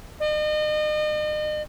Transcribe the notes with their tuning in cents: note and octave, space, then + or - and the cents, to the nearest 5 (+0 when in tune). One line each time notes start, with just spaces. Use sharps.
D#5 -40